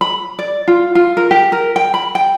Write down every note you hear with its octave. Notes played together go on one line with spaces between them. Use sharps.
B5
D5
F4
F4
A#4
G4
A#4
G5
B5
G5